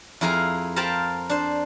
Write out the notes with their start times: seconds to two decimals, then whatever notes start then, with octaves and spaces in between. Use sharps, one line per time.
0.21 F2 E4 G#4 A#4 F5 G#5
0.76 A#4 C5 F5 G5 A5 B5
1.29 D4 C5